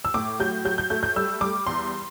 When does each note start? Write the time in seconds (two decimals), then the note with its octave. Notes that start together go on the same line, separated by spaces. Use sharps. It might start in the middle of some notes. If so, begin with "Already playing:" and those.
0.05 E6
0.14 A2 D6
0.40 F#3 G6
0.65 F#3 G6
0.78 G6
0.90 A3 G6
1.03 G6
1.16 G3 E6
1.41 G3 D6
1.67 E2 C6